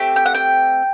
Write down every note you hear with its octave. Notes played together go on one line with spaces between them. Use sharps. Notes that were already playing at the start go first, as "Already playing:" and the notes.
Already playing: A3 C4 G4
G5
F#5
G5